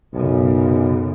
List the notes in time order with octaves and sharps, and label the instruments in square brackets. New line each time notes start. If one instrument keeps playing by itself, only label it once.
[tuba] B1 [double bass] F#2 C#3